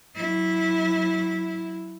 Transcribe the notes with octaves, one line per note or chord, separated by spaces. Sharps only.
F#3 E4